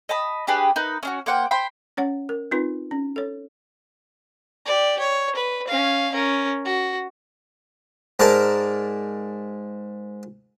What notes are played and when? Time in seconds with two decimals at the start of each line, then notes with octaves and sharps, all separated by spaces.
0.09 D#5 A5 B5
0.47 D4 G4 G#4 B4
0.76 D#4 A#4 B4
1.03 C#4 D4 F#4
1.26 A#3 C5 F#5 G5
1.51 C5 G5 B5 C6
1.97 C#4 C#5 F#5
2.29 A#4
2.51 C4 D#4 F4 B4
2.91 C#4
3.16 A4 C#5
4.66 G4 D5
4.99 C#5
5.36 B4
5.68 C#4 F5
6.12 C#4 A#4
6.65 F#4
8.20 G#2 A#4 D5 A5